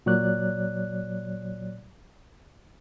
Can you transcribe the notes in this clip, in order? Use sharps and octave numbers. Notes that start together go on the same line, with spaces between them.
A#2 F#3 C#5 D5 F#6